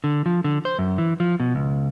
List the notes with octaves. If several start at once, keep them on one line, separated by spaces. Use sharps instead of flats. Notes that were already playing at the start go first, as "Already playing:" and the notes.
D3
F3
D3
C5
F#2
E3
F3
B2
C#2